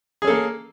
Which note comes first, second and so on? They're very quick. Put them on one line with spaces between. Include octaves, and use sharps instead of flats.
G#4 C#4 A4 A#3